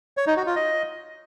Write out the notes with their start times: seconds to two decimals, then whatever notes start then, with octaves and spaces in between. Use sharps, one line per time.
0.17 C#5
0.27 D#4
0.37 F#4
0.46 F4
0.56 D#5